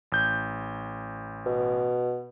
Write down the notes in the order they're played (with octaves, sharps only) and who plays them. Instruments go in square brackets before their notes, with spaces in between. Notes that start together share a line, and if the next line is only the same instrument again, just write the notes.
[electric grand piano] A1 G6
[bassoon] B2